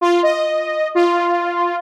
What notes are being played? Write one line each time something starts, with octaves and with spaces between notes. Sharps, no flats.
F4
D#5
F4